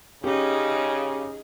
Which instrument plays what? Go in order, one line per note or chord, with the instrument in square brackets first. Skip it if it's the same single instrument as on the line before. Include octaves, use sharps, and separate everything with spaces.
[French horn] C#3 [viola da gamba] C#4 D#4 [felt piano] G4 [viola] G#4